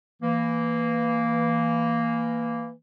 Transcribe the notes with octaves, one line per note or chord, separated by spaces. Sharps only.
E3 A#3